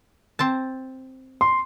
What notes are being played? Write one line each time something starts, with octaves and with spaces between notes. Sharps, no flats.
C4 C5 A5
C6